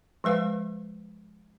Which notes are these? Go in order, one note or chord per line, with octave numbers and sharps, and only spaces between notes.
F3 G#3 B4 F5